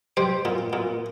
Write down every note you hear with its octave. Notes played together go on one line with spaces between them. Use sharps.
G3 C5
A#2
A#2